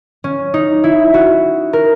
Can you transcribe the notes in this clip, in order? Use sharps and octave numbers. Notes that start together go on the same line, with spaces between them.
C#4
D#4
E4
F#4
A#4